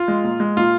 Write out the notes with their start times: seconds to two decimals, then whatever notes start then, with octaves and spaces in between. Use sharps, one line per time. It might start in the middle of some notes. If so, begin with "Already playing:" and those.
Already playing: F4
0.08 G#3
0.24 A#2
0.40 G#3
0.57 A#2 F4